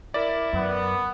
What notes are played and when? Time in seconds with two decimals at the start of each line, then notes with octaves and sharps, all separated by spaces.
0.14 E4 A#4 D5
0.53 F#2 B3